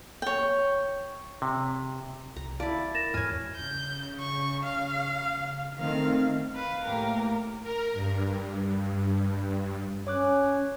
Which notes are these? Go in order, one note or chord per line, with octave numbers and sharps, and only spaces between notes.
C#5 G5
C3
C2 A#5
E4 D5 F5 A5
A#4 A6 A#6 E7
E2 G#2 C#5 G#5 F6 G#6
C#3 G6
C#6
F5
D#3 A3 C4 F5
B4 F5
A2 A#3 G4 A#4
A#4
G2
C#4 C#5 D6 F#6